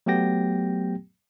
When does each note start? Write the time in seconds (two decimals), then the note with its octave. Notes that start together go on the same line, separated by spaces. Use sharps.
0.06 F#3 A3 B3 G4 G5 A#6